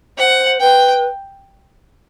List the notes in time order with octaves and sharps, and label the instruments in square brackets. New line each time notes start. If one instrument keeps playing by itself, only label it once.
[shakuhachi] C5 [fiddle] F#5
[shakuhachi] B4 [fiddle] G5